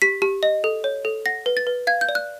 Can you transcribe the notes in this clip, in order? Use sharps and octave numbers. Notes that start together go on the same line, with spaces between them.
G4 B6
G4
D#5
A4
C#5
A4
F#5 A#6
B4
A6
B4
F5 G#6
G6
D5
F#6